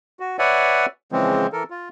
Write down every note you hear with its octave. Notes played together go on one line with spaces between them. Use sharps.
F#4
B4 C#5 D5 E5 F#5 G#5
C#3 E3 F3 G#3 C4
E3 A4 A#4
F4